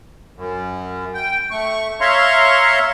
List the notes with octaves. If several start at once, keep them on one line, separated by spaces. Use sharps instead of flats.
F#2
G5
A3 C#6
C#5 E5 F5 A#5 C6 C#6